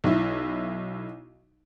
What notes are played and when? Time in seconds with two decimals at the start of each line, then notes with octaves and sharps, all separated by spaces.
0.04 B1 E4